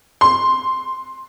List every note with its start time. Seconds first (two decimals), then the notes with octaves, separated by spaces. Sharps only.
0.21 C6